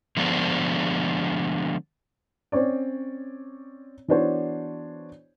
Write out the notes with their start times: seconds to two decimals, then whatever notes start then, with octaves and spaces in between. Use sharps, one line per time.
0.17 D3 F3 G#3 B3 D4 C5
2.52 C4 C#4 C#5 D5
4.08 E3 B3 D4 F#4 C5 C#5